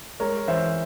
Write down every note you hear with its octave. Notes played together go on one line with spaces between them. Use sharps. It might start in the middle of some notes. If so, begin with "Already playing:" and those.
G#3 A#4 C#5
E3 C5 E5